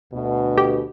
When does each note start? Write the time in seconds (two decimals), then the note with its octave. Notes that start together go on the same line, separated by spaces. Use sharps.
0.13 D2 B2
0.58 G4